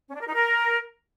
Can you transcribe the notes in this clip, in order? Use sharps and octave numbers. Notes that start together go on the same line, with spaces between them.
C#4
D4
A#4
D#4
A#4